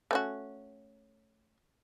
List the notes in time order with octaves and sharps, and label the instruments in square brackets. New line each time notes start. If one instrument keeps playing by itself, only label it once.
[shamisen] A3 C#4 F#4